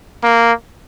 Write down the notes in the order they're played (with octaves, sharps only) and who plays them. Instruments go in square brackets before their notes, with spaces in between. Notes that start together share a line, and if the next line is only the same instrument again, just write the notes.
[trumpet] A#3